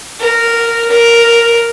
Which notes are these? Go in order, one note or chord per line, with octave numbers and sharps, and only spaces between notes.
A#4
A#4